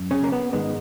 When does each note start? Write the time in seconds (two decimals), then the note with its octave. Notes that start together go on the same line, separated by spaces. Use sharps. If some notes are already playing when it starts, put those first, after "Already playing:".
Already playing: F#2
0.11 C#3 C#4
0.24 A#3
0.32 B3
0.53 G#2 D#3 G#3 B3